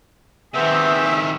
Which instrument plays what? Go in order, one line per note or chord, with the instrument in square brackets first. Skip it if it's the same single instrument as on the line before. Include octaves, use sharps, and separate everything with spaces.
[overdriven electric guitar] C3 D#3 [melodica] B3 C4 [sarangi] G#4 [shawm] E5